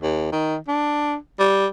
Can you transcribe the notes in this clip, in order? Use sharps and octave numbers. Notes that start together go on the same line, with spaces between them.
D#2
D#3
D4
G3